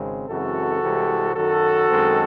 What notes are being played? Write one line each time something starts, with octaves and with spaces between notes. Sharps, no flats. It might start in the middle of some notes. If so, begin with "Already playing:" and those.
Already playing: G#1 C#3 G#3 C4
F#2 C#3 E3 G#3 C4 F#4 A4
C2 C3 E3 G#3
F#2 D#3 F#3 F#4 A4
F#2 D#3 G#3 C4